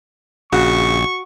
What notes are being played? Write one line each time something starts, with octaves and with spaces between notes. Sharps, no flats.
A#1 C#3 F#4 C#6